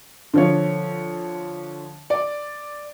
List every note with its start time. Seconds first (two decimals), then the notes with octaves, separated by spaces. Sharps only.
0.34 D3 F3 C#5
2.10 D5